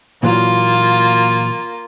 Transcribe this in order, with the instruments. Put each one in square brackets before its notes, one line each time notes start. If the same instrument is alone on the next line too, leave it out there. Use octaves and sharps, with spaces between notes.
[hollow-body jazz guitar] A#2 E3 F#3 [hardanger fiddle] A#3 F4